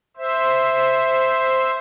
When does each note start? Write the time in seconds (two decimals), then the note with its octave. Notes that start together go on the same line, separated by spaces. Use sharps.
0.17 C5 E5